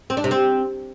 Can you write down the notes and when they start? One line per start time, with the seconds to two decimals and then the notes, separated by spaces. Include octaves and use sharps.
0.10 C4
0.17 D4
0.24 C3
0.31 C4